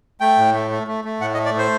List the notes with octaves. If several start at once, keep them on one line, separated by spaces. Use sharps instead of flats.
A3 G5
A2
A3
A3
A3
A3
A2 F#5
D#5
A3
D5
A2 C5